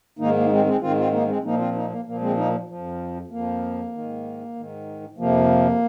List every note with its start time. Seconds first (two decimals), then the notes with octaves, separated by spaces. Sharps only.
0.19 G#2 D#3 A#3 D#4
0.35 A#3
0.46 D#4
0.50 G#3 C4
0.66 G#3 C4
0.81 G#2 D#3 C4 F4
0.97 C4 F4
1.12 A#3 D#4
1.27 G#3 C4
1.43 A#2 F3 A#3 D#4
1.59 C4 F4
1.74 A#3 D#4
1.90 A#3
2.06 A#2 F3 A#3
2.21 G#3 C4
2.37 A#3 D#4
2.68 F2 F3
3.30 F2 F3 A#3
3.92 D#3
3.98 G#2
4.55 G#2 D#3
5.18 F2 C3 F3 A#3